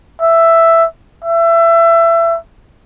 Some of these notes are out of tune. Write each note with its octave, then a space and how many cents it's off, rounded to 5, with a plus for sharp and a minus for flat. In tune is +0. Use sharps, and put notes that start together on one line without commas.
E5 +5
E5 +25